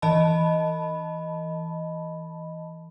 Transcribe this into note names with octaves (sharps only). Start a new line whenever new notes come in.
E3 D#5 A5 B5